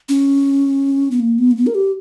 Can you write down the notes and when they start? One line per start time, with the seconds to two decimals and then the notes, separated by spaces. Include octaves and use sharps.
0.09 C#4
1.11 B3
1.20 A#3
1.38 B3
1.51 A#3
1.57 B3
1.67 A#4
1.75 G4